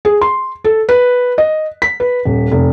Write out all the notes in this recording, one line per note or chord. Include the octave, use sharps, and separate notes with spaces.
G#4
C6
A4
B4
D#5
B6
B4
D#1
F1